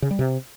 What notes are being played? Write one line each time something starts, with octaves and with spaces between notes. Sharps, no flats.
C#3
G3
C3